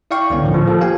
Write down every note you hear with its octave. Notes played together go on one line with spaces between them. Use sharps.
E4 D5 F5 G5 C#6
C#2 D3 B3 C#4
A2 D3 D#3 F3
F3
F3 A#3 A4
G4 F5 G#5